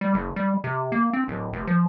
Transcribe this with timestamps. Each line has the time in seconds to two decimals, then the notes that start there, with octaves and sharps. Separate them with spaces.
0.01 G3
0.14 F#1
0.36 G3
0.64 C3
0.92 A#3
1.13 C4
1.28 D1
1.53 F1
1.67 F3